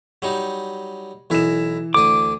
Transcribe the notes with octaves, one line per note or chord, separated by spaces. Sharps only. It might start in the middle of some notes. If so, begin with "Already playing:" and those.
F#3 G3 D#4
B1 E3 E4 A#4 E7
D2 D4 D6 D#6